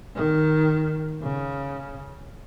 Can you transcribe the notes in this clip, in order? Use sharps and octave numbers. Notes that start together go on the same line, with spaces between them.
D#3
C#3